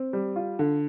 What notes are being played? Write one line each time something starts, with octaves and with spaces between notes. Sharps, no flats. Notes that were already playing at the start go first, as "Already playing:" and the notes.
Already playing: C4
G3
F4
D3